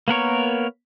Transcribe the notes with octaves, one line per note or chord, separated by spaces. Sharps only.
A#3 B3 A#4 C#5